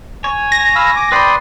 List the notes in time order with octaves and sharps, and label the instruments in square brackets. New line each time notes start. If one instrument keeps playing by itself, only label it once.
[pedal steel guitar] C#5 [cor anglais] G#5
[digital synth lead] A#6
[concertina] F5 B5 E6
D6
[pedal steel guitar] B4 B5 [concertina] D5 C6 D#6 [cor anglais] G5